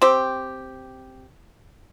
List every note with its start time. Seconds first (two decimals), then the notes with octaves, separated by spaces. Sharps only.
0.02 C4 G4